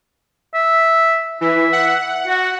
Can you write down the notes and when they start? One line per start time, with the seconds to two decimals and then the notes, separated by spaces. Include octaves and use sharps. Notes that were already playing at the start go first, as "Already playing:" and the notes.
0.54 E5
1.41 E3 E5
1.72 F#5
2.27 F#4